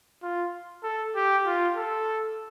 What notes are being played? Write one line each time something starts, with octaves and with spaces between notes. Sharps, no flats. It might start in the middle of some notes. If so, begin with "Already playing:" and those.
F4
A4
G4
F4
A4